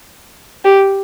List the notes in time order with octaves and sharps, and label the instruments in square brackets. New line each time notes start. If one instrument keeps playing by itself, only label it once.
[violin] G4